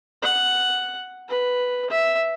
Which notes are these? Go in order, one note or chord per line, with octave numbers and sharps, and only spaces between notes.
F#5
B4
E5